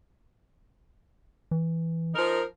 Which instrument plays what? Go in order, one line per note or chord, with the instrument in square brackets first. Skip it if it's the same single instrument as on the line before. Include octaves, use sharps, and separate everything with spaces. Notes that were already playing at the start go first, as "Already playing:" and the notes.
[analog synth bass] E3
[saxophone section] F3 D#4 A#4